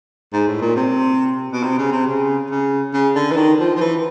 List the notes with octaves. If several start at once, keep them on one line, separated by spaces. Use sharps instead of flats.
G#2
A2
A#2
C3
B2
C3
C#3
C3
C#3
C#3
C#3
D3
E3
D#3
F3
F3
E3